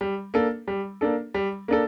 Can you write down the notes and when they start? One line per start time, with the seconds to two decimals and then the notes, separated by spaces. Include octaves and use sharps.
0.01 G3
0.34 A#3 D4 A4
0.68 G3
1.01 A#3 D4 A4
1.34 G3
1.68 A#3 D4 A4